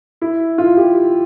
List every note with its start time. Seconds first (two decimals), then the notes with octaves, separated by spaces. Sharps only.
0.22 E4
0.58 F4
0.77 G4